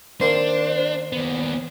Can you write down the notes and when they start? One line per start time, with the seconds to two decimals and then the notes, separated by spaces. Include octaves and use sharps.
0.21 D#3 A#3 C4 D4 C5
1.13 D#2 B3